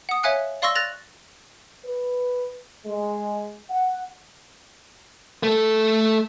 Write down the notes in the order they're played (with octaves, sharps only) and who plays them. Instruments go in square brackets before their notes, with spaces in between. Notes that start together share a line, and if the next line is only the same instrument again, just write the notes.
[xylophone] F#5 D#6
C#5 E5 F5 G#5 F#6 C#7
D5 F5 C6 C#6 E6 A#6
F#6 A6 A#6 F7 F#7
[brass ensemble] B4
G#3
F#5
[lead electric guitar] A3 A4